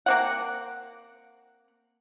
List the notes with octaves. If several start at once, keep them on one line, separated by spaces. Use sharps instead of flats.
A#3 C4 F#5